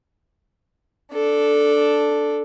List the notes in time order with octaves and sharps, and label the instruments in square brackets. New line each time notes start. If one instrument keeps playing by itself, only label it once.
[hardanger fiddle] D4 A4